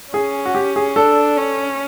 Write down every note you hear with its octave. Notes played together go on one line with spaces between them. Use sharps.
C#4 G#4
F#4
G4
G#4
D4 A4
C#4